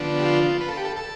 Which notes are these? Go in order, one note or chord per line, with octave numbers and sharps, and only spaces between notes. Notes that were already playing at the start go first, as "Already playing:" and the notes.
Already playing: D3 F3 B3 D4
G4
F4
B4
A4
G4
A4
A4